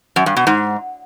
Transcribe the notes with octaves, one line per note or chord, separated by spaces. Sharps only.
F#2
G2
B2
G#2